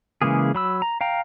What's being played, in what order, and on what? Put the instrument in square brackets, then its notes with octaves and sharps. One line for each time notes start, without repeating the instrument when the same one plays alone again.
[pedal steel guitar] C#3 E3 G#3 A#3 G#4
F#3 B5 E6
A#5
F5 G5 A#5